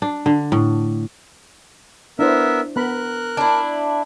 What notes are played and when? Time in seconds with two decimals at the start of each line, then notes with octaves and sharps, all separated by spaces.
0.02 D4
0.26 D3
0.52 A2
2.19 B3 D4 E4 A#4 C5 E5
2.76 B3 A#4 B5 F#6
3.37 D4 E4